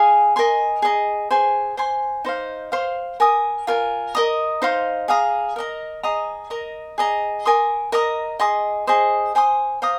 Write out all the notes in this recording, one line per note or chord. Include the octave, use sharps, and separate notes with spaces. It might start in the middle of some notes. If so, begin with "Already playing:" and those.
Already playing: G#4 F5 G#5 D#6
A#4 D#5 G#5 C6
G#4 D#5 A#5
G#4 C5 G#5
C5 G#5 C6
D#4 C5 F5
C5 F5 C6
A#4 G#5 D#6
F4 A#4 G#5
A#4 D#5 A#5 D#6
D#4 C5 F5 C6
G#4 F5 A#5 D#6
A#4 D#5 A#5
G#4 D#5 A#5 D#6
A#4 D#5 A#5
G#4 D#5 A#5
A#4 G#5 C6 D#6
A#4 D#5 A#5 D#6
G#4 D#5 C6 D#6
G#4 C5 D#5
C5 G#5 C6 D#6
C5 F5 A#5 D#6